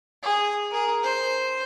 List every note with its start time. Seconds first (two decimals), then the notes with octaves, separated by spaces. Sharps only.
0.23 G#4
0.71 G#4 A#4
1.03 C5